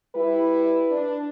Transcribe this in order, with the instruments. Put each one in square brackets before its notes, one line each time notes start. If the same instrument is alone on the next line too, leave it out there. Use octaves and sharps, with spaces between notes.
[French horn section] G3 E4 [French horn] B4
[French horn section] D4